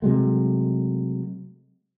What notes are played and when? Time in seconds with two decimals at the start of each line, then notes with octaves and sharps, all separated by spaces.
0.02 C3 F#3 G#3 A3